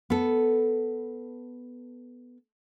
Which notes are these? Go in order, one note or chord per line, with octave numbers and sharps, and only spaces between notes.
B3 A4